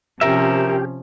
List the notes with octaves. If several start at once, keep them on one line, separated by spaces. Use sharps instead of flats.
C3 F3 C#4 G4 A#4 E5